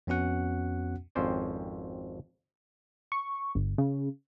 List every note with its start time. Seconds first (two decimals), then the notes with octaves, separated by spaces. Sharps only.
0.07 F2 B3 C#4 F#4 F#5
1.15 G#1 F2 C4 C#4 C5 D5
3.12 C#6
3.55 G1
3.78 C#3